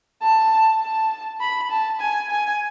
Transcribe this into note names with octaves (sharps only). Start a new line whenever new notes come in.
A5
A5
B5
A5
G#5
G#5